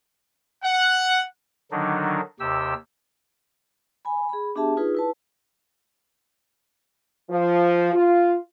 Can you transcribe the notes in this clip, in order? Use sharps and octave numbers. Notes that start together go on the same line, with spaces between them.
F#5
D3 D#3 F#3 D4 D#4
D#2 C3 G4 E6
G#5 B5
G#4 B5
B3 D4 G4 G#4 E5 A5
D#4 F4 G#4 B4
E4 B4 A5
F3
F4